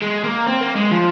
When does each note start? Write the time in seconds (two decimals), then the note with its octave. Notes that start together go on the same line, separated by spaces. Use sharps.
0.02 G#3
0.24 A#3
0.47 C4
0.61 A#3
0.76 G#3
0.92 F3